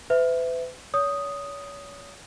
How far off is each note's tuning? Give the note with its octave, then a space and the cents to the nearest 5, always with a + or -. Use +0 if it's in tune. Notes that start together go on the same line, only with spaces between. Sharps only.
B4 +40 E5 +0
C#5 +35 D#6 +0